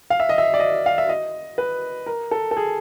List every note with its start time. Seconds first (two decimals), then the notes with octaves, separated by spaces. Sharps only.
0.10 F5
0.20 E5
0.29 D#5
0.38 E5
0.54 D5
0.60 D#5
0.86 F5
0.98 E5
1.09 D#5
1.58 B4
2.06 A#4
2.31 A4
2.51 A4
2.57 G#4